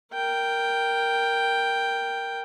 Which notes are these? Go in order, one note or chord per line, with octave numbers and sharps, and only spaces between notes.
A#4 G5